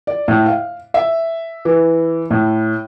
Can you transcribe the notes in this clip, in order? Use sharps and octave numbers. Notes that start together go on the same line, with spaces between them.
D5
A2
F5
E5
E3
A2